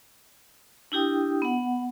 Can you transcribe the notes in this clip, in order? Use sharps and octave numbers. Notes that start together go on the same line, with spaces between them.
D4 E4 G4 G5 D#6
B3 F#5